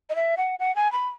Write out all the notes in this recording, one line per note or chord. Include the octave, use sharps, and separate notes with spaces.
D#5
E5
F#5
F#5
G#5
B5